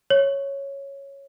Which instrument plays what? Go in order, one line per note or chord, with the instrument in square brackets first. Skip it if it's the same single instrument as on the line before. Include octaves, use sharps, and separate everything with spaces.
[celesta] C#5